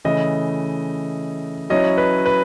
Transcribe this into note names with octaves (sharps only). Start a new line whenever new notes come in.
C#3 E3 A3 D#5
F#3 C#4 E4 D#5
B4
B4